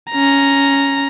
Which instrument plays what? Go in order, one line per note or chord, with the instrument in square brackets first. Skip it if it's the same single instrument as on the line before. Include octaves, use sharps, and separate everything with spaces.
[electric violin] C#4 A#5